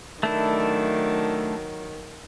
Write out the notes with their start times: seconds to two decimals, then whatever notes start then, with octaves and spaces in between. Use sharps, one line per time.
0.23 D#3 F#3 A3 D4 E4